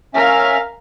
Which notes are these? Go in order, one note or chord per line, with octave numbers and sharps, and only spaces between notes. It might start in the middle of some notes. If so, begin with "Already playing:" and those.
C#4 A#4 E5 F5